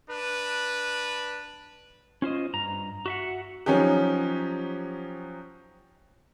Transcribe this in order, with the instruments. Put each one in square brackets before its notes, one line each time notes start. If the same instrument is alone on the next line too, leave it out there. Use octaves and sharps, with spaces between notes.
[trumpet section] D4 B4
[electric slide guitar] C#4 F4 C5 D#5
G2 A#5
F#4 E5 F#5
[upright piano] F3 F#3 C#4 D#4 G4